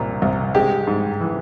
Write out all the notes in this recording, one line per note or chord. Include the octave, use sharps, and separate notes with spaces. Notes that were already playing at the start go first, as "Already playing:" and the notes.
Already playing: C2 A#2
C2
G#3 G4
G#2
E3